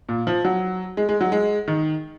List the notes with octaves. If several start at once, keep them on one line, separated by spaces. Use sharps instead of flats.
A#2
F3
F#3
G#3
G#3
F#3
G#3
D#3